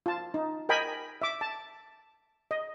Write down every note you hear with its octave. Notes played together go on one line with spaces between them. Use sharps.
F4 A5
D#4
A#4 D#5 G5 G#5 B5
E5 D6
A5
D#5